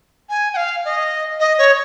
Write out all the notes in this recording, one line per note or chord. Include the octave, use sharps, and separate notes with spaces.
G#5
G5
F5
D#5
D#5
C#5